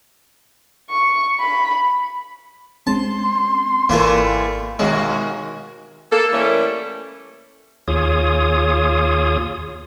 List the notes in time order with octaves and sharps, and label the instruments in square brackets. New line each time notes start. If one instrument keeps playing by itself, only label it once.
[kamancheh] C#6
B5
[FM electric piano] G#3 C4 C#4 [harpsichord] A5 [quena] C6
[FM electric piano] G#1 [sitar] E3 G3 A3 [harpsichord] A#3 F4 A#4
[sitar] B2 D#3 F#4 [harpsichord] G#3 [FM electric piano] C#5 E5 F5
[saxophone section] A#3 A4
E3 G3 A3 A#3 C#4
[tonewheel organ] D#2 F4 G#4 C#5 D#6